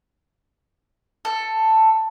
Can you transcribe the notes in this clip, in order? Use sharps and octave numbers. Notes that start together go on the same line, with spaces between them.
A4